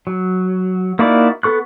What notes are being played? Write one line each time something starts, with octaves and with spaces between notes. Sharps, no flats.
F#3
A#3 D#4 E4 F#4 D5
B3 A4 C#6 F#6